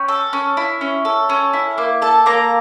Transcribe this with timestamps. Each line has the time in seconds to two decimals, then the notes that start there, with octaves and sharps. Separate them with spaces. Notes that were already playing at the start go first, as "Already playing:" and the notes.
Already playing: C#4 G5
0.08 A4
0.33 C#4
0.57 E4
0.81 C#4
1.05 A4
1.29 C#4
1.53 E4
1.78 A#3
2.02 A4 A5
2.26 A#3 A#5